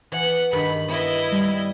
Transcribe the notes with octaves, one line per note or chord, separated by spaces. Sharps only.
E3 F#5
G2 D#3 B5
B3 E4 D#5
G3